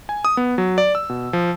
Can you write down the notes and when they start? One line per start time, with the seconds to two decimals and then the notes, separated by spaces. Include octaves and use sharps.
0.09 G#5
0.25 D#6
0.37 B3
0.58 F#3
0.78 D5
0.95 E6
1.09 B2
1.33 F3